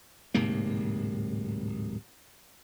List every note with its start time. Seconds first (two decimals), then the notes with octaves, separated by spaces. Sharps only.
0.34 D1 G#2 C3 A#3